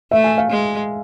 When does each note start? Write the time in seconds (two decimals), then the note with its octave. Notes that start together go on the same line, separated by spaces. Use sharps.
0.11 A3 E5
0.24 G#5
0.38 F5
0.50 G#3